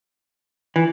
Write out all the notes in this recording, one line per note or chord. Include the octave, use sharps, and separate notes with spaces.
E3